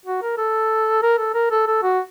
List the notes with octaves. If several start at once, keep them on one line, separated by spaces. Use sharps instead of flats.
F#4
A#4
A4
A#4
A4
A#4
A4
A4
F#4